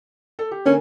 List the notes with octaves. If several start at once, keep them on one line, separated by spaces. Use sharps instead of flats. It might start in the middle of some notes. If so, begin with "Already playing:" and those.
A4
G4
D3 A#3 C#4 G#5